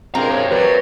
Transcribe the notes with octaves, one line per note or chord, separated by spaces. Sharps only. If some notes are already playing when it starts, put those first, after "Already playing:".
G2 A#2 G#3 C4 A#4 A#5
A#4 C#5
F#3 G3 B4